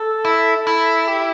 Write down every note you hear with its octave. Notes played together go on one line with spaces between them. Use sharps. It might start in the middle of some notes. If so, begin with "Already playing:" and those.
Already playing: A4
E4
E4
G4